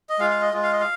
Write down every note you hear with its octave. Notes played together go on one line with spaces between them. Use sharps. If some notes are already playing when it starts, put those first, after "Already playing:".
D#5
G#3 F4 F5
F5
D#5
G#3 F4
F5
D#5
F5